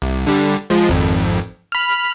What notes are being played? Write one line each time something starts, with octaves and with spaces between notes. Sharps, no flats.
C2
D3 G3
F3 G#3
G#1 F2
B5 F6